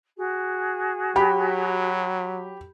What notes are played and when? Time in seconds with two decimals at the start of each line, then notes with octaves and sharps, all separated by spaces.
0.16 F#4 G#4
1.16 F#3 G4 B5